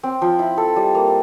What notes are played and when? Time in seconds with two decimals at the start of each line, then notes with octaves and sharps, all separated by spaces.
0.03 C4
0.22 F3
0.39 E4
0.57 A4
0.76 G3
0.95 A#3